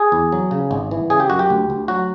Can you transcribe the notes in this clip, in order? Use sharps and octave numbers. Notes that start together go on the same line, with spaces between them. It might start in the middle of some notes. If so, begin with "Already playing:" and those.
Already playing: G#4
E2
F#3
C#3
G#1
E3
C#3 G#4
G4
F#2 F#4
G4
D2
D2
F#3 F#4